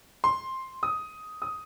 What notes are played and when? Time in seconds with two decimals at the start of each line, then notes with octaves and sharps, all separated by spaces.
0.24 C6
0.83 D#6
1.42 D#6